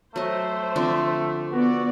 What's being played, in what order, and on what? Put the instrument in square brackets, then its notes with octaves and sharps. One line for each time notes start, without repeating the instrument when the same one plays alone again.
[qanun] F#3 D#5 [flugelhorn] A3 [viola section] C5
[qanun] D3 F3 C4
[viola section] B3 D5 [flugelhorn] F#4